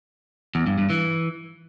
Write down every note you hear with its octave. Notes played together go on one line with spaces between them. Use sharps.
E2
G2
G2
E3